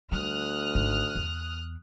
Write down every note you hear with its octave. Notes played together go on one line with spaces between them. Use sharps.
D2 G3 D#6 F6 F#6
G#1
E2